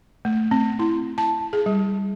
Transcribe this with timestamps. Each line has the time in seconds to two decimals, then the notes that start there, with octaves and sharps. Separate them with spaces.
0.25 A3
0.51 C4
0.79 E4
1.18 A5
1.53 G#4
1.66 G3